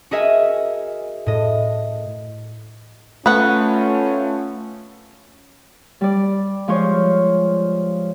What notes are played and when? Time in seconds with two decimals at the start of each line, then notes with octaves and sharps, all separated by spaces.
0.11 F#4 G#4 A#4 D#5 E5 G#5
1.26 A2 D#5
3.26 A3 B3 C#4 F4 F#5
6.01 G3 D5
6.68 F3 G#3 F4 C5 C#5